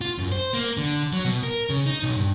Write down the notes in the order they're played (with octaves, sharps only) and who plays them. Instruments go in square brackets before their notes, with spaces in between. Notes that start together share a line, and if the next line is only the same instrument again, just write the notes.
[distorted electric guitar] F4
F#2
C5
A#3
D3
F#3
B2
A#4
C#3
D#4
B1
G2